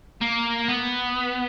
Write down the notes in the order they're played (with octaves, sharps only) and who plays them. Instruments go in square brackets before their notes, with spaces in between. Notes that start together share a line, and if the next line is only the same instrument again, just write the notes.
[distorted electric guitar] A#3
B3